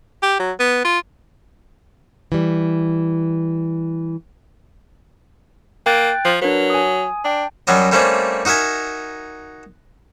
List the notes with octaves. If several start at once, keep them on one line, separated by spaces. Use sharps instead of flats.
G4
F#3
B3
F4
E3 G3
A#3 G5 F#6 A6
F3
F#3 D4 A#4 B4
G#5 D#6
D4 G5 A5
F#2 F#3 G3 D#5
G3 A3 A#3 C4 C#4
D#4 F#4 A#4 E5 G#5